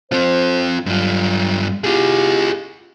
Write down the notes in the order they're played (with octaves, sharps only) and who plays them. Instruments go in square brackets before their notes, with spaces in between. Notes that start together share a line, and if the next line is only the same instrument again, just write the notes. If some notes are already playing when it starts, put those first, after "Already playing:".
[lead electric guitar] C4 F4 [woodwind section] C5
[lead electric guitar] G2 F4 [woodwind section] F#3
[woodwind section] B3 E4 G4 [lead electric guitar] F4 G#4